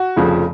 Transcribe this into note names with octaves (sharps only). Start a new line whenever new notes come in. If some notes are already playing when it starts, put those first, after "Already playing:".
Already playing: F#4
F1 F2 C#3 F3